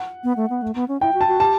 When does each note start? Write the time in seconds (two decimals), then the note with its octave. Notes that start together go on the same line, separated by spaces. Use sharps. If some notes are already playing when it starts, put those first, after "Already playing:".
Already playing: F#5
0.24 B3
0.37 A3
0.50 B3
0.62 A3
0.75 B3
0.88 C#4
1.01 E4 G5
1.14 F#4
1.21 A5
1.27 F#4
1.40 G4 A5